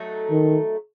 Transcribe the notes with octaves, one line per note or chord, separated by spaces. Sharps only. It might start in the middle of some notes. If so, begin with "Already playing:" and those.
Already playing: F#3 A3 D#4 A4
D#3